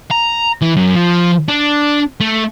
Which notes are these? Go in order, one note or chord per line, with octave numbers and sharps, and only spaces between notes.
A#5
E3
F#2
F3
D4
A3